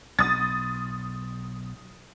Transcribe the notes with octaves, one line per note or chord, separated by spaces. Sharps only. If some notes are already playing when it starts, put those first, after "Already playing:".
B1 D#6 A6